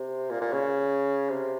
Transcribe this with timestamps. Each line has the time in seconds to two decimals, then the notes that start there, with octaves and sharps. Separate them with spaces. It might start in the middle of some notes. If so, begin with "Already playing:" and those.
Already playing: C3
0.30 A#2
0.41 A#2
0.52 C#3
1.30 C3